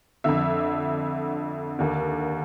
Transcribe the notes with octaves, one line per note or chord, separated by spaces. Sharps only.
F2 D3 E5
D#2 D3